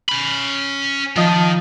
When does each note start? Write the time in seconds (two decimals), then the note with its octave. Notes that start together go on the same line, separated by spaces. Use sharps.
0.09 C#4 B5
1.16 D#3 F3 D#5 A5